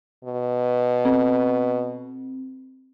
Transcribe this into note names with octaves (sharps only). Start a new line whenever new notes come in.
B2
C4